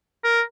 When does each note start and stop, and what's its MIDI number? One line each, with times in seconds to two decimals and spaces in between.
0.24 0.41 70